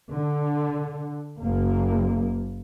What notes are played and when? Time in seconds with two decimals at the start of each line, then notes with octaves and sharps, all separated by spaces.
0.12 D3
1.39 F#1 A#3